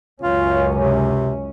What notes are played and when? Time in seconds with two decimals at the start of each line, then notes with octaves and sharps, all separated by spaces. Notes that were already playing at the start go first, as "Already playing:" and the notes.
0.22 C#2 F#2 C#4 F4
0.77 C3